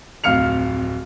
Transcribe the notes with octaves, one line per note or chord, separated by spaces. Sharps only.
D1 F2 F5 F6 C#7 F7